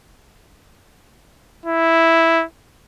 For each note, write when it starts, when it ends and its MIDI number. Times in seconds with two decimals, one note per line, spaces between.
1.66 2.44 64